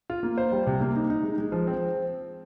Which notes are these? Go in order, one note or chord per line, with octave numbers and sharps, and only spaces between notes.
F4
A#3
C5
G3
C3
A#3
D#4
D#4
G#3
G#3
F3
C4